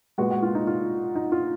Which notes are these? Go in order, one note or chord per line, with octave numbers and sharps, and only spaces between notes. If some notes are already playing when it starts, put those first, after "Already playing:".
A#2 G#3 B3 F#4
F#4
F4
D#4
F4
D#4
F4